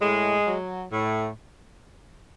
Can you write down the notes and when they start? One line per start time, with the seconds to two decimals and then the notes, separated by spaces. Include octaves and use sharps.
0.01 A2 G#3
0.47 F#3
0.92 A2